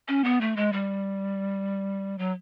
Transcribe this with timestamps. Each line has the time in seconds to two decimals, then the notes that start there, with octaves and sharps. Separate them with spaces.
0.08 C#4
0.24 B3
0.41 A3
0.56 G#3
0.73 G3
2.18 F#3